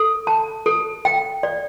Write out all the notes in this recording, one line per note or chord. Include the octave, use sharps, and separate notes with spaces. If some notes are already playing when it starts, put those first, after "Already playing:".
Already playing: A4
A5
A4
G5
D5